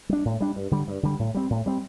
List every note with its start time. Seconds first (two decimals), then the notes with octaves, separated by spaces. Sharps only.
0.09 G3 D4
0.25 A2
0.41 G3 D4
0.56 G2
0.71 D3 G3
0.88 G2
1.03 D3 G3
1.19 A2
1.35 G3 C4
1.50 A2
1.66 G3 C4